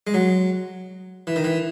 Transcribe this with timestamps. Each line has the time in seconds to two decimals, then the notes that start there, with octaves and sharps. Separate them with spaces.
0.07 G#3
0.14 F#3
1.27 E3
1.36 D#3
1.44 E3